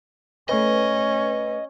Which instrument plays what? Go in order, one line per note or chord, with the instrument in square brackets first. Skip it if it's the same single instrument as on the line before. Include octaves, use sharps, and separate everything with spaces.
[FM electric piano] A3 B4 [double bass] C#4 [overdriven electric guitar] D#5